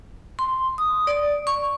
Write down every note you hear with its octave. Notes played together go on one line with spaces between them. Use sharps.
C6
D#6
D5
C#6